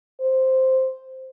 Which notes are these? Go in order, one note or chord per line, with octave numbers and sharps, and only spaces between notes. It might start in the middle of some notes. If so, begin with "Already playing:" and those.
C5